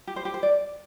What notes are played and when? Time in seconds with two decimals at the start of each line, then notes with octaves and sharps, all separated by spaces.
0.07 G4
0.16 C5
0.25 G4
0.34 C5
0.43 D5